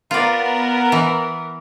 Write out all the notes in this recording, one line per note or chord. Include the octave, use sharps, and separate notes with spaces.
B3 F4 A#4 D5
E3